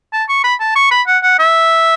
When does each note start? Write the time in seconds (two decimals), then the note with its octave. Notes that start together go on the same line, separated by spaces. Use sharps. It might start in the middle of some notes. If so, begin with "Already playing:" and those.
0.13 A5
0.29 C#6
0.44 B5
0.60 A5
0.76 C#6
0.91 B5
1.07 F#5
1.23 F#5
1.39 E5